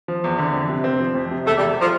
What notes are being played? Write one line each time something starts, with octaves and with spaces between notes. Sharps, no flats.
F3
E2
D3
F2
C3
C4
F3
F2
C3
E1 A3
G3
E2
F3